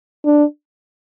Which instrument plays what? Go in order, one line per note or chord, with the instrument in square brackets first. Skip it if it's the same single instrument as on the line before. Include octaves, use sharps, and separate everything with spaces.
[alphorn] D4